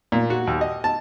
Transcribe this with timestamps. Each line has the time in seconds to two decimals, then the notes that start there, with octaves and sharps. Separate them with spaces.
0.12 A#2
0.30 F#4
0.47 D#2
0.61 D#5
0.84 A5